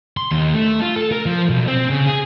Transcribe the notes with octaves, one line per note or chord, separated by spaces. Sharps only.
C6
D#2
A3
F4
A4
A#4
F3
B1
C4
C#3
G#4